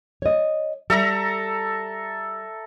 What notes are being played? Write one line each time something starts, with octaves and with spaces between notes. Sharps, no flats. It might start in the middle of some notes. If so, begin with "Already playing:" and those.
C#5 D#5
G3 A4 E5 A#5